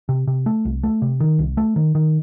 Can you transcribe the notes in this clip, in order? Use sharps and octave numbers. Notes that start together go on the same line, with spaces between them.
C3
C3
A3
C2
A3
C3
D#3
C2
A3
D#3
D#3